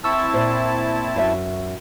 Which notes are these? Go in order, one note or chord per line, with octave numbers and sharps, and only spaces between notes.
C4 E4 A5 C#6 E6
A#2 C5
F#2 E5